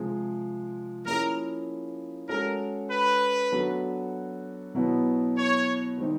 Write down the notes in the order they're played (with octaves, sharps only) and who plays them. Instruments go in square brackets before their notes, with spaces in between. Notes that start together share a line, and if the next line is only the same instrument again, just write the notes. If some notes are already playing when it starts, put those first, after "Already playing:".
Already playing: [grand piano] C3 F3 G#3
[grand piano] F3 A#3 C#4 E4 G#4 [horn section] A#4
[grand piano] G#3 C#4 F#4 A4 [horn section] A#4
[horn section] B4
[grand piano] F#3 B3 D4 F#4 A4
B2 F#3 B3 E4
[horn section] C#5
[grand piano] D#3 G3 C4 D#4